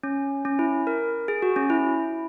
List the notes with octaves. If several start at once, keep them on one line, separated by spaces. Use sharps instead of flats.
C#4
C#4
E4
A#4
G#4
F#4
C#4
E4